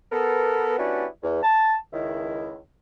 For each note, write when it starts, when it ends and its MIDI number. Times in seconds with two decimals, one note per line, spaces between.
0.12 0.77 59
0.12 0.77 69
0.12 0.77 70
0.78 1.06 55
0.78 1.06 59
0.78 1.06 61
0.78 1.06 62
0.78 1.06 64
0.78 1.06 66
1.23 1.39 40
1.43 1.75 81
1.93 2.57 37
1.93 2.57 51
1.93 2.57 64